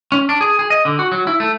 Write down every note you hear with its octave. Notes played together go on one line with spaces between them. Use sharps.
C#4
D4
G#4
G#4
D#5
D3
F#4
F#3
E4
A3